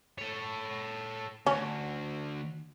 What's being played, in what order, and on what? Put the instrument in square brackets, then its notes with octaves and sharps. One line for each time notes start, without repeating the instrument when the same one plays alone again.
[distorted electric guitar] A4 C#5
[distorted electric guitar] D2 [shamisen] C#4